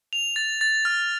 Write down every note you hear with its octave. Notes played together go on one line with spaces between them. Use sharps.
F7
A6
A6
F6